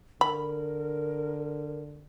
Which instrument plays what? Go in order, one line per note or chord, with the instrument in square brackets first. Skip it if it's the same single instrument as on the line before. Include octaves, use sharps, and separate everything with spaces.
[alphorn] D3 [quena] A#4 [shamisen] B5